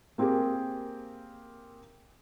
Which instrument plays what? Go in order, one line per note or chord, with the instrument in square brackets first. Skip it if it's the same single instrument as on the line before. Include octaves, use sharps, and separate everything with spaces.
[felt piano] A#3 C4 G4 G#4 A#4